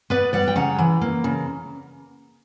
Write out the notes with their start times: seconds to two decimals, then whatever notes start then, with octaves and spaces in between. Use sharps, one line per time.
0.10 B3 B4 D5
0.33 G3 D5 F#5
0.48 G5
0.56 C#3 F#5 A#5
0.78 E3
1.01 A#3
1.24 C#3